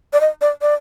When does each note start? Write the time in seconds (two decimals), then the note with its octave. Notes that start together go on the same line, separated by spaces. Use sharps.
0.13 D5
0.20 D#5
0.41 D5
0.62 D5